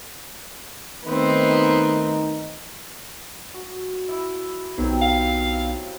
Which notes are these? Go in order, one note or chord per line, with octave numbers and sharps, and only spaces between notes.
D#3 A3 B3 C4 D#4
F#4
E4
B1 F#3 B3 C4 D#4 G4
F5